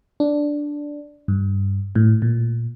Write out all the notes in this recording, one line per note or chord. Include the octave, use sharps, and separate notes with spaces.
D4
G2
A2
A#2